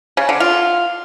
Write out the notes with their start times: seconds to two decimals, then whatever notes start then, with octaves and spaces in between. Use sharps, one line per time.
0.17 C#3
0.29 D3
0.40 F4